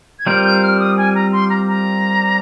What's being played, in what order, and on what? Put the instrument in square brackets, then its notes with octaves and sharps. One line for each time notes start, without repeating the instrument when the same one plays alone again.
[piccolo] G#6
[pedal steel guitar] G3 C4 F4 A#4 [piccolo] G6
[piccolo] G6
F6
D#6
G#5
A#5
C6
A#5
A#5